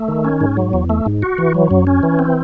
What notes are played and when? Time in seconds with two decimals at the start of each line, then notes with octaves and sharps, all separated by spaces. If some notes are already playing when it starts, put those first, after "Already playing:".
Already playing: A3
0.08 D#3
0.25 C#4
0.41 G#2
0.57 F#3
0.73 E2
0.90 A3
1.06 G#2
1.22 F#4
1.38 E3
1.54 F#3
1.71 F#2
1.87 C#4
2.03 E3
2.19 C4